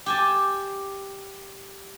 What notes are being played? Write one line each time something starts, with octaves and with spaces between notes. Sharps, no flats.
G4 G#5 A5